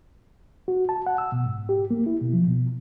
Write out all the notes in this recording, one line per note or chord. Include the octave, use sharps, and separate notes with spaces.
F#4
A5
F#5
E6
B2
G#2
G4
A#3
E4
B2
F3
B2